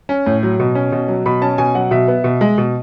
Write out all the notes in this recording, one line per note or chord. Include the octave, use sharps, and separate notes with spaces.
C#4
A2
F#3
B2
C#4
B2
F#3
B2 B5
C#4 A5
B2 G#5
F#3 F#5
B2 E5
B3
B2
G#3
B2